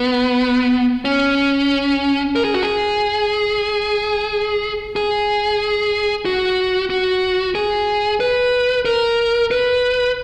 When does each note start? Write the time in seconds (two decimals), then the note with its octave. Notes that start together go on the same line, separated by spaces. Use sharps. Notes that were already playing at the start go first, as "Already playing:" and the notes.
Already playing: B3
1.05 C#4
2.36 A#4
2.45 G#4
2.54 F#4
2.63 G#4
4.96 G#4
6.25 F#4
6.90 F#4
7.55 G#4
8.20 B4
8.85 A#4
9.51 B4